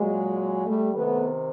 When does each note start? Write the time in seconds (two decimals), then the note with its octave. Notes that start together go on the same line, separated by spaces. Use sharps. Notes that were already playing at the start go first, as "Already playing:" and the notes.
Already playing: A#2 F#3 G#3
0.66 G3 A3
0.94 C3 D#3 A3 B3